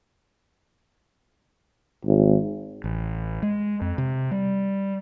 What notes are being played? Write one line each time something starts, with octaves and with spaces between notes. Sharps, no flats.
G#1
A1
G#3
F2
C3
G3